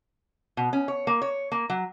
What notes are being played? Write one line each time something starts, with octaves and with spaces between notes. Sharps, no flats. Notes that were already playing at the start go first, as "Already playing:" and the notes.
B2
C#4
C#5
A#3
C#5
A#3
F#3